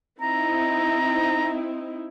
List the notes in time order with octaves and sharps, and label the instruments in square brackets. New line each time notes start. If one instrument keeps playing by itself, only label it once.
[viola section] C4 D#4 E4 [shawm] A#5